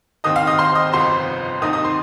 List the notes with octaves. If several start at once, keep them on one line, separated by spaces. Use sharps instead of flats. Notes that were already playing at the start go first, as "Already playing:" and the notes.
D#2 D#3 C4 D#5 D#6
F5 F6
D#5 D#6
C5 C6
D#5 D#6
G1 F2 C3 C5 C6
D#2 D#3 C4 D#4 D#5 D#6
D#5 D#6
C5 C6